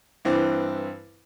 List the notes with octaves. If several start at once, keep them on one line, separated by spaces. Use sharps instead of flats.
G2 E3 C4